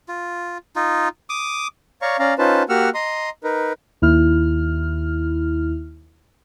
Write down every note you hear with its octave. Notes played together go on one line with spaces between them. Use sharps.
F4
D#4 F4
D6 D#6
C#5 D5 F5 A#5 C#6
C#4 D5 F5 A#5
C#4 D#4 F4 B4 C5 A5
A#3 F#4 G4 F#5 E6 F6
D#5 A#5 C6 D#6
D#4 A#4 B4
D#2 E4 F6